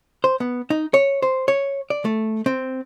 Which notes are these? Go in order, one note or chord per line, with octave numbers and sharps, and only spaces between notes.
C5
B3
D#4
C#5
C5
C#5
D5
A3
C4